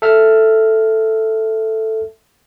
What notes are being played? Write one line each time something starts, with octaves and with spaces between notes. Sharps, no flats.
A4 E5 F6